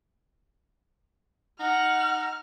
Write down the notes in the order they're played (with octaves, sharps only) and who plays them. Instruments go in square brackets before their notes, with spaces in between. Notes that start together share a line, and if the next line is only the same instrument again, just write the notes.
[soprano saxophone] D#4 [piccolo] F#5 [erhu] F6